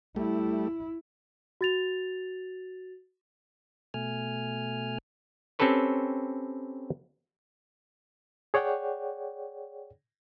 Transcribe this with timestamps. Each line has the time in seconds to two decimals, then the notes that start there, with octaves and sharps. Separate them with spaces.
0.16 G3 A3 E4
1.61 F#4 A6 F7
3.94 B2 A3 G#5 F6
5.59 C4 C#4 G4 A4 B4 C#5
8.54 G#4 C#5 D5 F#5 G5